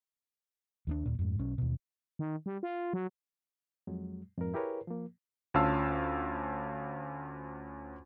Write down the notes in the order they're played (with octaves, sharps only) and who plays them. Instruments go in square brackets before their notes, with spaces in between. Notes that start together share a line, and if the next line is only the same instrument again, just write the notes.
[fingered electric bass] D#2 G3 D4
D#2 A#2
F2 G#2
B1 C#4
D#2 B2
[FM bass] D#3
G3
F4
F#3
[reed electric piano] F2 F#3 G#3
F2 G#2 A#4
E4 G4 G#4 A#4 B4 C#5
F3 A#3
[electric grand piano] D2 C#4 F4 F5 A5 E6